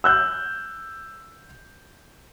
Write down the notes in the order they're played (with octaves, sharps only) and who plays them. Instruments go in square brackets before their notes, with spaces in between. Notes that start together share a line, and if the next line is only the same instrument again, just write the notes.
[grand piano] E6 F#6 G6